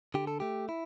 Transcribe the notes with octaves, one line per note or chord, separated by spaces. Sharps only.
D3 G4
A4
A3 G4
E4